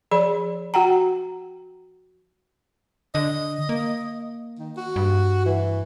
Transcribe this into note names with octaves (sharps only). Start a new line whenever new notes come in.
F3 G#4 D5 B5
F#4 F#5 G5 A#5
D3 D#5
A#3
D#3
F#4
G2
E3